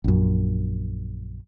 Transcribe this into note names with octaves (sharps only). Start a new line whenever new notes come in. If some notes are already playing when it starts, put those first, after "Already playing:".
A#1 F#2